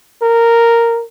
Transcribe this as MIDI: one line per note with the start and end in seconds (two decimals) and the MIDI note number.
0.22 1.03 70